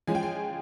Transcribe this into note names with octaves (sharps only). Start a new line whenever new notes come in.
F3 G#3 C#4 G#5
G5
G#5